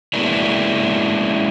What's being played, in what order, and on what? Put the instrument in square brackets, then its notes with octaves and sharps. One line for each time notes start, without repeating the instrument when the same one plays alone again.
[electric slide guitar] G#3 A#3 B3 C#4 D4 E4